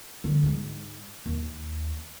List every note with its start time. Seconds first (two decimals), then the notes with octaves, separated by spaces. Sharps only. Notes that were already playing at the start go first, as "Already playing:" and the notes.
0.24 D3
0.43 G#2 G#3
1.26 D#2